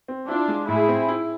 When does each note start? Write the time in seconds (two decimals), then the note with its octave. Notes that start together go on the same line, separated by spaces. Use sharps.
0.08 C4
0.28 D4 E4 F4
0.48 G#3
0.68 A2 E4 G#4
0.88 C4
1.08 E4